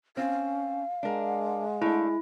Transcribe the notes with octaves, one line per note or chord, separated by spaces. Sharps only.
C4 C#4 F5
G#3 D4 A#4
A3 D4 E4